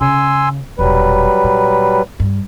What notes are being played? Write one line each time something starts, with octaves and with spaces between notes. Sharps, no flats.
C#3 G#5 C6 E6
E1 A#2 F#3 G3 B4
A#2
G2